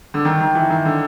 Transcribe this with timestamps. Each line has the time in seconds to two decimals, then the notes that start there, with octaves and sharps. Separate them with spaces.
0.14 D3
0.25 D#3
0.41 D#3
0.55 E3
0.70 D#3
0.85 D3